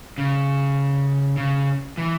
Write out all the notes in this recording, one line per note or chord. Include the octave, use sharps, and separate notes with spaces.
C#3
C#3
E3